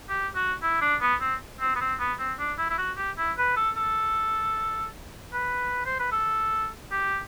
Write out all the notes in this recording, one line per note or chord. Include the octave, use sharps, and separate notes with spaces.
G4
F#4
E4
D4
B3
C4
C4
B3
C4
B3
C4
D4
E4
E4
F#4
G4
E4
B4
A4
A4
B4
C5
B4
A4
G4